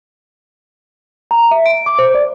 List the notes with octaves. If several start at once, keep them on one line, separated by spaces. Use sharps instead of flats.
A#5
E5
D7
D6
C5
D5